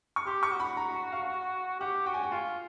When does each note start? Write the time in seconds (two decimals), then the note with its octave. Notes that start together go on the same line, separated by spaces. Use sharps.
0.16 C#6
0.26 G4 C6
0.43 C#6
0.52 F#4
0.60 B5
0.77 A#5
0.94 A#5
1.12 F5
1.80 G4 F#5
2.06 F#4 G5
2.14 G#5
2.23 G5
2.32 F4 G#5